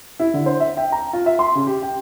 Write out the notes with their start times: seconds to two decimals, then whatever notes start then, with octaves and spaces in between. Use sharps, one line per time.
0.20 E4
0.34 D3
0.46 C5
0.60 E5
0.77 G5
0.92 A#5
1.13 F4
1.26 E5
1.39 C6
1.55 C#3
1.67 G4
1.83 G5